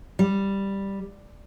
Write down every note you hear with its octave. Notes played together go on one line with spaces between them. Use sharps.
G3